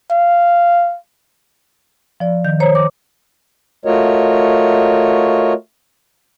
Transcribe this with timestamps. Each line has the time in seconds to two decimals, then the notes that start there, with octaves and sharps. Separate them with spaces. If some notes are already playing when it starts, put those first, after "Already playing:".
0.11 F5
2.20 F3 D5
2.44 D#3 G6
2.60 C5 C#5 A#5
2.75 D6
3.85 A3 F4 F#4 A#4 C#5 D#5